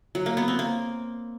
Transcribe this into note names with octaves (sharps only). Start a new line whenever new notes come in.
F#3
A#3
B3
C4
A#3